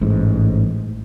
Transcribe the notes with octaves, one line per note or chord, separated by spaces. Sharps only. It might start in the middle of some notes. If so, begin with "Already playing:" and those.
A1 G#2